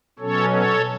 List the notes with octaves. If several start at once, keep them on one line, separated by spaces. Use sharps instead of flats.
B2 F#3 C#4 A4 C#5
A4 C#5